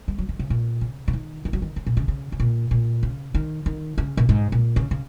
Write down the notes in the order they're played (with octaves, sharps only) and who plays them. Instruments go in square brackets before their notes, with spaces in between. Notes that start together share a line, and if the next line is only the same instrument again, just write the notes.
[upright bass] G#3
F#3
D#3
C#3
A#2
C#3
C#3
D#3
D#3
F#3
D#3
C#3
A#2
C#3
C#3
C#3
A#2
A#2
C#3
D#3
D#3
C#3
A#2
G#2
A#2
C#3
C#3